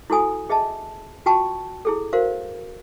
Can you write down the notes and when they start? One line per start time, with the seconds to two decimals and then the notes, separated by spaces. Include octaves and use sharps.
0.10 E4 F#4 A4 G#5 D#6
0.49 G#4 D#5 E5 A5
1.26 F4 F#4 G5 A5 C#6
1.85 E4 G#4 A4
2.13 F#4 A#4 C5 F5